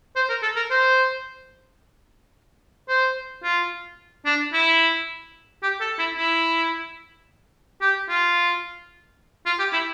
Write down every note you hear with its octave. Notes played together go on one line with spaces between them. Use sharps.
C5
A#4
A4
A#4
C5
C5
F4
D4
E4
G4
A4
E4
E4
G4
F4
F4
G4
E4